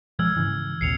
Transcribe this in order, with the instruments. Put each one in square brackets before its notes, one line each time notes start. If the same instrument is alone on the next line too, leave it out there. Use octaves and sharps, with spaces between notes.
[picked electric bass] B2 F3 G#3 [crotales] E6 F6 G#6
[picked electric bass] G#2 C#3 E3
[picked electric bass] A#1 D#2 C3 [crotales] C7 C#7 F7